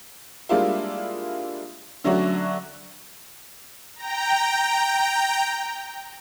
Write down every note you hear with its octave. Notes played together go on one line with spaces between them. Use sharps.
G3 G#3 A#3 D4 E4 F4
D3 F#3 A3 C#4 D4 F#4
G5 A#5